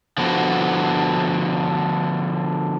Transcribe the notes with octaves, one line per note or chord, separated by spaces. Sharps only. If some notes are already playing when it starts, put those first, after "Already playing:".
D3 F3 B3 F#4